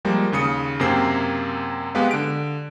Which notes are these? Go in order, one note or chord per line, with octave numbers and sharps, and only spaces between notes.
F3 G3 G#3 A#3
D#2 C#3 D#6 C#7
F#2 C3 A#3 C4 C7
G#3 B3 G4 B4 F5
D3 D7